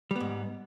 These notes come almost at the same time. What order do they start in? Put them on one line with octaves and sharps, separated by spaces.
G3 B3 G#2